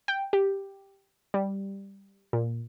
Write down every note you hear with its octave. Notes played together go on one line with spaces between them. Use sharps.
G5
G4
G3
A#2